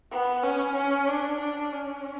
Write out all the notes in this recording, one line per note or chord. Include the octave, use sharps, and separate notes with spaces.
B3
C#4
C#4
D4
D4
C#4